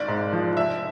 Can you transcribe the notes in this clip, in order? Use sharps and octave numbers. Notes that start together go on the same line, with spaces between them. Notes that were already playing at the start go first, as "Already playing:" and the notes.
Already playing: G#1 D5
G#2
F3
F1 E5